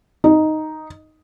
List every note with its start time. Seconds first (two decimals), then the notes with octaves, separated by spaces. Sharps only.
0.24 D#4